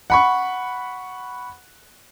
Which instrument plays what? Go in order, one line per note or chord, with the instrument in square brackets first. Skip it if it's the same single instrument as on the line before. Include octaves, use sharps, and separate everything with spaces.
[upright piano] F#5 B5 C#6